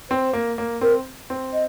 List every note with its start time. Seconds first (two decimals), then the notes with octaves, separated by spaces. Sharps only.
0.10 C4 C5
0.33 A#3
0.58 A#3
0.81 C4 A#4
1.30 C4
1.53 D#5